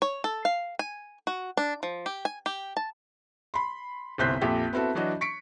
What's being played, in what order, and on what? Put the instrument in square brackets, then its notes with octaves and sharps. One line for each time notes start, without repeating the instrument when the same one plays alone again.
[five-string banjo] C#5
A4
F5
G#5
F#4
D4
F3
G4
G#5
G4
A5
[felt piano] B5 C6
G1 C2 C5 F#6 G6 B6
A#1 F2 G4 A4 E5
B3 C4 E4 F#4 A4
E3 F#3 D4 F#4 D#5
C#6 B6 C#7 D7